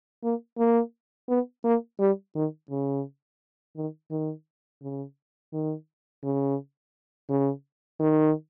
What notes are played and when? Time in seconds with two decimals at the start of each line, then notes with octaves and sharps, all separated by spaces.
0.24 A#3
0.59 A#3
1.29 B3
1.65 A#3
2.00 G3
2.35 D#3
2.71 C#3
3.77 D#3
4.11 D#3
4.82 C#3
5.53 D#3
6.24 C#3
7.30 C#3
8.00 D#3